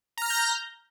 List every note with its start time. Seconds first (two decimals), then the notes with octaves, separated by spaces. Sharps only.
0.18 A#5
0.22 F6
0.26 A#6
0.30 G6